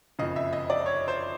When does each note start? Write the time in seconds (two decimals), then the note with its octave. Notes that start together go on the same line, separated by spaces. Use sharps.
0.19 F#1 F2 C#3 D#5
0.36 E5
0.53 D#5
0.70 D5
0.86 C#5
1.08 C5